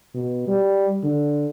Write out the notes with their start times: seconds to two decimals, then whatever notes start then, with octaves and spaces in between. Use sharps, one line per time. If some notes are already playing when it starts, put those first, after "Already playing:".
0.14 B2
0.47 G3
1.03 D3